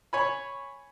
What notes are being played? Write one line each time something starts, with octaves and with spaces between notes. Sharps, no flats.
C#5 G#5 B5